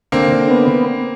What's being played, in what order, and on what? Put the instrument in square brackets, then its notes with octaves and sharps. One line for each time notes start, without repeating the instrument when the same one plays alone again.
[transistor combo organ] D3 [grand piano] A#3 C4
[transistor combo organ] D3
B3